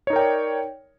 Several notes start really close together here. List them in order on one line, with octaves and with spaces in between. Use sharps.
C#5 D#4 A#4 G5 D5